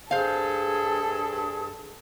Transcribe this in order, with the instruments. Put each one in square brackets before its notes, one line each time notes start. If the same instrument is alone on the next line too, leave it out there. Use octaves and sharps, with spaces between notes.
[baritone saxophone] G2 [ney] G#4 [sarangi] A4 [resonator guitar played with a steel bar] C5 F5